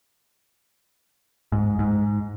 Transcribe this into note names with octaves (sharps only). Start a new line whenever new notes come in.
G#2
G#2